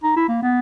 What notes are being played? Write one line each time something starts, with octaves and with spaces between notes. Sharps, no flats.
D#4
E4
A#3
B3